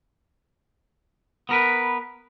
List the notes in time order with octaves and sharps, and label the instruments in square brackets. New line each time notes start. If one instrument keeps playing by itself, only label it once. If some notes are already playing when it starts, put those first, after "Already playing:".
[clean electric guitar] B3 A#4 B4